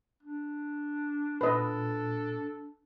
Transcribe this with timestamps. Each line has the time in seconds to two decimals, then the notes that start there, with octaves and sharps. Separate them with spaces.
0.23 D4
1.41 A#2 D4 A4 B4 D#5